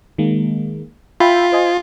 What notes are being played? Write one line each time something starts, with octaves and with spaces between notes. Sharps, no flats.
D#3 G#3 A#3
F4 E5 G5 B5
C5 D#5 G#5